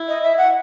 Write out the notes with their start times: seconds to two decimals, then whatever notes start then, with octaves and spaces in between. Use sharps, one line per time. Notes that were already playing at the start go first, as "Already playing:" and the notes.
Already playing: E4
0.08 D#5
0.23 E5
0.38 F#5